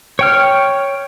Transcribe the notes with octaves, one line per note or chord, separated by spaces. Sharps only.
C#5 G5 F6